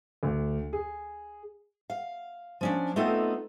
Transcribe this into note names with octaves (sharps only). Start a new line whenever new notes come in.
D2
G#4
F5
F3 C#4 D4
A3 B3 C4 D#4 F4 A4